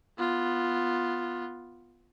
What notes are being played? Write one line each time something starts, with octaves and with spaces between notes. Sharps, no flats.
B3 F4